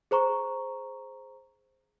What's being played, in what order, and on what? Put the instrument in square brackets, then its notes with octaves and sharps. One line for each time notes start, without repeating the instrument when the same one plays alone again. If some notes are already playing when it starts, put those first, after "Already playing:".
[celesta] G#4 C5 A#5 C#6